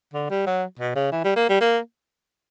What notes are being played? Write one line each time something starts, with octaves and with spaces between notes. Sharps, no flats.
D3
G3
F#3
B2
C#3
E3
G3
A#3
G3
A#3